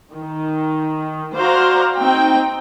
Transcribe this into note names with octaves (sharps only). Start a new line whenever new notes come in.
D#3
F#4 C5 D5 F5 A#5
C4 D#4 G5